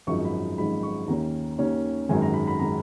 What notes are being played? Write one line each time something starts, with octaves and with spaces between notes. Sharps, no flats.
G#1 F#2 F3 G#3 D#4 C#6
B5
G#1 F#2 F3 G#3 D#4 B5
C#6
D#2 D#3 A#3 C#4 A#5
D#2 D#3 A#3 C#4
G#1 F#2 D#3 G#3 G#5
A#5
B5
B5
D#3 G#3 A#5